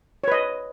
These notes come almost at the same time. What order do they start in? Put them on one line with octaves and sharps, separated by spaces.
C#5 B4 D#5